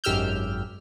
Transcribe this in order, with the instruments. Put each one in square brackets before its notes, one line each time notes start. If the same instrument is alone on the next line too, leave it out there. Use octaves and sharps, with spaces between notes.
[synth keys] G#1 F#2 G4 E6 F6 G6